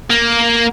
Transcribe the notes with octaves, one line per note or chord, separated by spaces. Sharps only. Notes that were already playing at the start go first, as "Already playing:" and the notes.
A#3